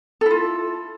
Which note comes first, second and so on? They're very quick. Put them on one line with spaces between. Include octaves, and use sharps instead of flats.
A4 E4 F4